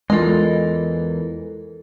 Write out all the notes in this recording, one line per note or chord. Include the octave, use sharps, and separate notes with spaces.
E2 E3 G#3 F4 A4 A#4 D#5